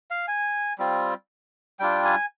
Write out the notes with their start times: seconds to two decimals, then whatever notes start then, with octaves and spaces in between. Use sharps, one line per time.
0.11 F5
0.28 G#5
0.79 G3 C4 F4
1.79 G3 D4 F4 G5
2.05 G#5